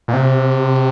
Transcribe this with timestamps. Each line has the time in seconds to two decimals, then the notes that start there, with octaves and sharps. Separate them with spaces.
0.08 A#2
0.13 C3